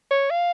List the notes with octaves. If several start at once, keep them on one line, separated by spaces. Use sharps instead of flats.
C#5
F5